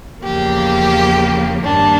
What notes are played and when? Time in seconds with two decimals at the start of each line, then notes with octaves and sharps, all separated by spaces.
0.22 E2 C#3 F3 A#3 G4
1.63 G2 D#3 G3 A#3 D4